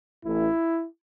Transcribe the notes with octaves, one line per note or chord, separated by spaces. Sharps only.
A1 A2 E3 E4